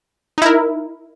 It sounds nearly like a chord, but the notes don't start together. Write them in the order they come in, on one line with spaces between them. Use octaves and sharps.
D#4 E4 A#4